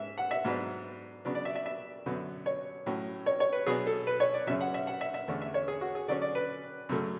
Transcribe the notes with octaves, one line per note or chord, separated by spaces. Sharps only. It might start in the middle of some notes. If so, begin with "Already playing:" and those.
Already playing: G#2 G#3 C#4 E5
F#5
E5
G#2 F#3 B3 D4
C#3 F#3 B3 D4
D5
E5
E5
E5
F#2 D3 F#3 B3
C#5
A2 F#3 C#4
C#5
C#5
B4
B2 F#3 B3 D4 G#4
A4
B4
C#5
D5
F#2 C#3 F#3 E5
F#5
E5
F#5
E5
E5
E2 D3 A3 C#4
E5
C#5
G#4
F#4
G#4
D3 F#3 C#4 D5
D5
B4
F#2 C#3 F#3 A3